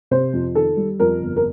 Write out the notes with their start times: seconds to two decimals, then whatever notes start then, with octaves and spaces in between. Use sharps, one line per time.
0.11 C3 C5
0.33 F2
0.55 D#3 A4
0.77 G3
0.99 F2 A#4
1.20 G1
1.36 A#4